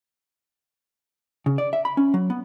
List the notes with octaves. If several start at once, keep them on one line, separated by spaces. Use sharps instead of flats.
C#3
D5
E5
B5
C#4
F#3
B3